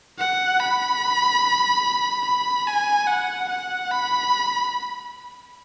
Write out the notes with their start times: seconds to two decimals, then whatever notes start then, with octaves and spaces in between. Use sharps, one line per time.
0.19 F#5
0.60 B5
2.26 B5
2.67 G#5
3.08 F#5
3.50 F#5
3.91 B5